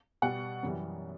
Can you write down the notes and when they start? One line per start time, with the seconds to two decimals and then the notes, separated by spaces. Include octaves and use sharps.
0.22 B2 G3 F#5
0.63 F#2 E3 G3